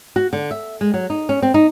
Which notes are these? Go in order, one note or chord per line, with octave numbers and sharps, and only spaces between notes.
F#4
D3
E5
G#3
F#3
D#4
C#4
C4
D#4